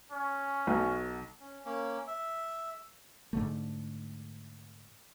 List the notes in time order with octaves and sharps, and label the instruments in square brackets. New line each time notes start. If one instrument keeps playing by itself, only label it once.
[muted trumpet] C#4
[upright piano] B1
[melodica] C#4
A#3 C#4
E5
[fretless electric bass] G#2 D3 A3